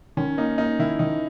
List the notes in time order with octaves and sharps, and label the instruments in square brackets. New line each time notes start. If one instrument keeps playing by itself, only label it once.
[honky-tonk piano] D#3 [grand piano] C#4
[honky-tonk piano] A#3 [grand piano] D#4
[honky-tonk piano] A#3 [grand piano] D#4
[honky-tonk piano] D#3 [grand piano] E4
[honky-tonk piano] D#3 [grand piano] D#4